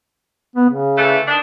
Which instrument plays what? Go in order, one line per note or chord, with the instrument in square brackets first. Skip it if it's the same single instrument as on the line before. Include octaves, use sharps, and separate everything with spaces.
[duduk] B3
C#3
[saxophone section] E3 A3
D#3 D4